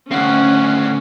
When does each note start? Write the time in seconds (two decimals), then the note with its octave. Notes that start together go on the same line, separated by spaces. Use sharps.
0.11 D2 C4 C#4 F#5